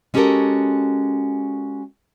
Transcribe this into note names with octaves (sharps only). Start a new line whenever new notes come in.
G#3 C#4 F#4 G4 A4 A#4